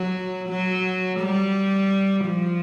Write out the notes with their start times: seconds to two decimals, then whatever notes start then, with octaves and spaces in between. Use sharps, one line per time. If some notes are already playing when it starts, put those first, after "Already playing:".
Already playing: F#3
0.48 F#3
1.19 G3
2.26 F3